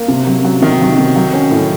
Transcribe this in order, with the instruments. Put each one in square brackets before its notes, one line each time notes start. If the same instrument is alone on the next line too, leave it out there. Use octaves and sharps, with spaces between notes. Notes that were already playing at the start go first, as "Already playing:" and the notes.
Already playing: [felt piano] A#3
C3
F#3
F#3
[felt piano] C3 [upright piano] D#3
[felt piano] F#3
C3
F#3
C#4
A2